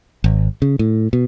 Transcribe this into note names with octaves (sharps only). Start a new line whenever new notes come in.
G#1
C#3
A2
B2